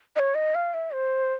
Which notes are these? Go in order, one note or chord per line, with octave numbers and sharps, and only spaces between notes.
D#5
C#5
D#5
F5
E5
C5